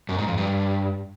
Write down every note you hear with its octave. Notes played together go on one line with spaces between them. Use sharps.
F#2
G#2
F2
G2